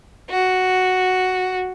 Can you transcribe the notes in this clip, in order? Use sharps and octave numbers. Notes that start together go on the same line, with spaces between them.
F#4